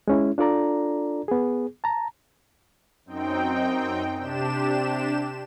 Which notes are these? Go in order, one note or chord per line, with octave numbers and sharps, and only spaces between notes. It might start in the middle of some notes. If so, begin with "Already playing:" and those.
G#3 C#4 E4
D4 F4 A4 D5 A#5
B3 G#4
A5 A#5
F#2 C4 D#4 G5
C3 D4 G4 E7